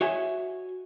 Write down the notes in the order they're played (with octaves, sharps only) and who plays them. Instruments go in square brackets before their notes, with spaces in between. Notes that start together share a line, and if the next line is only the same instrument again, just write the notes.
[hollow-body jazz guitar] F#4 C#5 D#5 E5 G#5